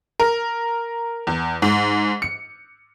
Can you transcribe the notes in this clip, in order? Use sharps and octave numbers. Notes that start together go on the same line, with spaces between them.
A#4
E2
G#2
C#7